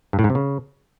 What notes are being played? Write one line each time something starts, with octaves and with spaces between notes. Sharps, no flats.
G2
A2
G#2
C3
C#3